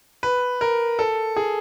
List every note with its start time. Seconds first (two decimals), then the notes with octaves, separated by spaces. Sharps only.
0.23 B4
0.61 A#4
0.99 A4
1.36 G#4